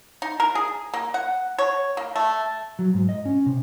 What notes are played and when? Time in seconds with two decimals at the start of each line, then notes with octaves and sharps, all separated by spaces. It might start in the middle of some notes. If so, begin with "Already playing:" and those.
0.22 D#4
0.40 A#4
0.55 G#4
0.94 A#3
1.14 F#5
1.58 C#5
1.97 A#3
2.16 A3
2.79 F#3
2.94 G#2
3.09 D#5
3.26 C#4
3.46 C3